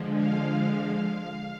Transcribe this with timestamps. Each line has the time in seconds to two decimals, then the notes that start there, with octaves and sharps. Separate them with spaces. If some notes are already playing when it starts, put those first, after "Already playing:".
Already playing: D3 F3 G#3
0.14 F5
0.53 F5